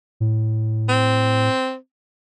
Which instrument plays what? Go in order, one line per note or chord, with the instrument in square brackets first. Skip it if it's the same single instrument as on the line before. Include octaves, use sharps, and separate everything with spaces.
[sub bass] A2
[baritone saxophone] C4